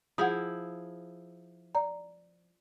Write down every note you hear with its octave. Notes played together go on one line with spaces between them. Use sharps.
F3 E4 G#4 F#5 D#6
D5 A#5